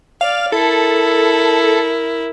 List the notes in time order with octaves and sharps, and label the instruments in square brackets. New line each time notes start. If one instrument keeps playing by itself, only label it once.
[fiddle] D5 [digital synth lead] F5
[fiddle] E4 A#4 [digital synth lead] A4